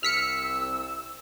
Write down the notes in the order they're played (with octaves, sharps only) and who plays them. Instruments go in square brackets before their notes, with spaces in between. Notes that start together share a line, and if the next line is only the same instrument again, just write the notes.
[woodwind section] C2 E6 [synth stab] F6 B6 C#7